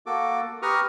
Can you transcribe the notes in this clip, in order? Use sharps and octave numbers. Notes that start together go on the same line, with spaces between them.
A#3 F#4 A4 D6
G4 B4 A#5 C#6 D#6 F6